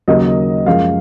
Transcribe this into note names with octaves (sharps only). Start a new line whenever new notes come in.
D#2 C#3 F#3 A#3 D#5
F#2 F3 G#3 F5